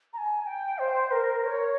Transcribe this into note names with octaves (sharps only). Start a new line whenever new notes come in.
A#5
G#5
G5
C5
A#4
C#5